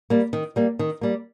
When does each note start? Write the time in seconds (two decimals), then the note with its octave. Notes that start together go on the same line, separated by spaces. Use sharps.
0.10 G3 A#3
0.33 D#3
0.56 G3 A#3
0.79 D#3
1.01 G3 A#3